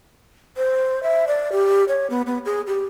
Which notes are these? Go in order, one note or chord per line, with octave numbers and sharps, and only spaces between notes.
C5
E5
D5
G4
C#5
B3
B3
G#4
G4